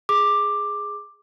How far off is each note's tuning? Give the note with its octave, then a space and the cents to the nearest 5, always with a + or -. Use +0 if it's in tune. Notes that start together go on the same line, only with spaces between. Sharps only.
G#4 +0 D6 +10